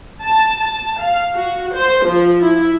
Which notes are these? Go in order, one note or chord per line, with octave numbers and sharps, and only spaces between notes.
A5
A5
F5
F#4
C5
F3
E4